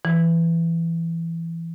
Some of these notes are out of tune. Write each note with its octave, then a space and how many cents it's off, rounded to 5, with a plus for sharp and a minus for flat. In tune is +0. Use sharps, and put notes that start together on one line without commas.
E3 +15